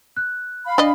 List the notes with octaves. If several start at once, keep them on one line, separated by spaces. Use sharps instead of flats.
F#6
F5 B5
D4 D5 D#5